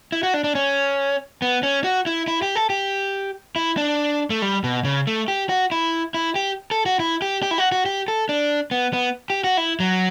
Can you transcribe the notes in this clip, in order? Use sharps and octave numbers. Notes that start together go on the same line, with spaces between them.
E4
F#4
D4
D4
C#4
B3
C#4
F#4
E4
E4
G4
A4
G4
E4
D4
A3
G3
B2
C#3
A3
G4
F#4
E4
E4
G4
A4
F#4
E4
G4
G4
E4
F#4
F#4
G4
A4
D4
B3
B3
G4
F#4
E4
F#3